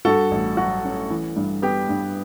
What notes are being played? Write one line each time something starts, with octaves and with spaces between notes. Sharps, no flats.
G2 F#4 A4
A1
F#3 F#4
C#4
E3
G2
B3 G4
G2